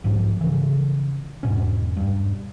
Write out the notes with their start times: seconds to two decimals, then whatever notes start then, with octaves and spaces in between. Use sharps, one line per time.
0.04 B1 G#2 F3
0.41 C#3 E3
1.43 E1 G#2 B2 C#4
1.97 G2